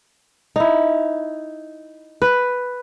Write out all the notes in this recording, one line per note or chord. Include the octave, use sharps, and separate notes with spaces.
D#4 E4
B4